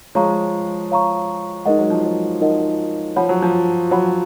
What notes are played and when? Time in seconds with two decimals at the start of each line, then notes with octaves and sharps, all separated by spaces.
0.15 F3 G#3 C#5 F5 A#5 C#6
0.91 C#5 F5 A#5 C#6
1.65 G#3 D#4 A#4 D#5 F#5
1.79 F#3
1.90 F3
2.03 F#3
2.41 D#4 A#4 D#5 F#5
3.16 F3 C#5 F#5 B5
3.29 F#3
3.42 F3
3.91 F#3 C#5 F#5 B5